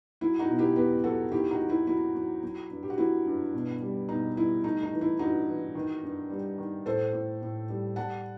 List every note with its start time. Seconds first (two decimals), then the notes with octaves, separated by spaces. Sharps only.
0.21 F#3 E4
0.39 D#4 F#4
0.50 B2
0.58 E4 G4
0.76 E2 G4 B4
1.04 F#3 F#4 A4
1.31 D#3 E4 G4
1.51 D#4 F#4
1.60 F#3
1.70 E4
1.87 F#3 E4
2.15 F#3
2.43 F#3
2.71 G2
2.83 G4
2.90 F#4
2.98 F#3 E4
3.26 G2
3.53 B2
3.82 G3
4.09 B2 D#4
4.36 G3 E4
4.64 A3 D#4
4.83 D#4
4.93 E3
5.01 E4
5.19 G2 D#4 F#4
5.48 E3
5.75 D#3
6.03 G2
6.30 G3
6.58 D#3
6.86 A2 A4 C5
7.13 A2
7.42 A2
7.69 G3
7.96 G3 F#5 A5